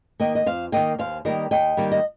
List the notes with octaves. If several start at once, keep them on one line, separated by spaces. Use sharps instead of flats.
D#3 A#3 D#5 G5
D#5
F2 C5 F5
D#3 A#3 D#5 G5
D#2 C5 F5
D#3 G3 A#3 A#4 D#5
D#2 D#5 G5
D#3 G3 A#3
D#5